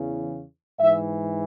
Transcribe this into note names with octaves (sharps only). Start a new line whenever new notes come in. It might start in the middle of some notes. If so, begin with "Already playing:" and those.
Already playing: E2 C#3 E3
G#2 E3 E5